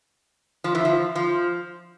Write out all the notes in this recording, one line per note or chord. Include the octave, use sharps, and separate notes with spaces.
F3
E3
F3
F3